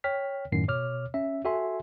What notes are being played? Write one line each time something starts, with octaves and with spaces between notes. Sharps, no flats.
C#5 G5 F6 B6
F#2 A2 D#3 C7
B2 C#5 D6 F6
C#4 E5
F#4 A4 E5 G#5 C6